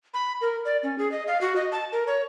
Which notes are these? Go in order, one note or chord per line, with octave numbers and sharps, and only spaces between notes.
B5
A#4
D5
C#4
G#4
D#5
F5
F#4
D#5
A5
A#4
C#5